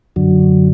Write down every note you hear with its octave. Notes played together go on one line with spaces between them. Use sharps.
F#2 D3 F#3